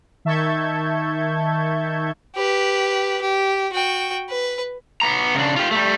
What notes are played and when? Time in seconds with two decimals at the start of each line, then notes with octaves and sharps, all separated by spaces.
0.25 D#3 E5 A5 C#6 G6 G#6
2.36 G4 B4
3.21 G4
3.73 F#4 G5
4.29 B4
5.01 B3 A#5
5.35 C#3 D4
5.56 F4 G4
5.71 G3 A3